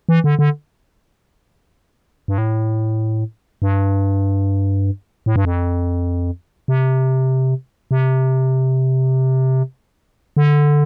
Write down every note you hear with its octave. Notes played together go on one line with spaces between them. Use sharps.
E3
D3
D3
G2
A2
G2
A2
G2
F2
C3
C3
D3